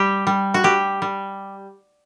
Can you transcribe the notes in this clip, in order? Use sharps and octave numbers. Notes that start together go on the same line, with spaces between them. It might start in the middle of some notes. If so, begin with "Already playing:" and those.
Already playing: G3 G4
G3
F#4
G3 G4
G3